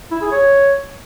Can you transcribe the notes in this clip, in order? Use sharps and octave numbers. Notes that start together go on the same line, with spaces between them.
E4
G#4
C#5